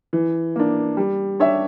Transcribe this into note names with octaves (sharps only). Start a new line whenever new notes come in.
E3
A#3 D4
G3
D4 G4 C#5 E5